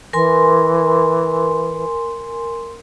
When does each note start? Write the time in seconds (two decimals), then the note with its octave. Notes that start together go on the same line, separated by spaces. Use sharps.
0.13 E3 A#4 G#5 C6